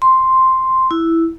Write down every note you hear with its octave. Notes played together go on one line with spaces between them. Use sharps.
C6
E4